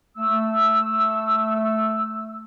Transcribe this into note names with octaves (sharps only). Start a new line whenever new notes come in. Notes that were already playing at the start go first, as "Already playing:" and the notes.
A3 E6